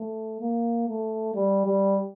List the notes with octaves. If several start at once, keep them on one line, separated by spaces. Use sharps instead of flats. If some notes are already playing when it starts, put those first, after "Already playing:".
Already playing: A3
A#3
A3
G3
G3